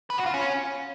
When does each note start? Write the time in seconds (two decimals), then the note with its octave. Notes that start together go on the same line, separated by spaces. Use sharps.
0.10 B4
0.18 F#4
0.26 F4
0.34 C#4